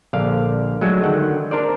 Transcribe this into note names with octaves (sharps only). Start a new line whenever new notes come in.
A#1 D3 D5 F5
F#3 G#3 A3 D4 F#4
D3 D#3 F#5 G5
D4 A#4 C5 D5